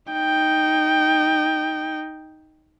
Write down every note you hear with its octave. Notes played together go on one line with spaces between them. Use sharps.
D#4 G5